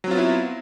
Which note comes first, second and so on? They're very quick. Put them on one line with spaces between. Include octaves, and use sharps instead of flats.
F#3 C4 F4 B3 E4